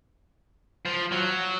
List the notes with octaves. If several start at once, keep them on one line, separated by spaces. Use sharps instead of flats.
F3
F#3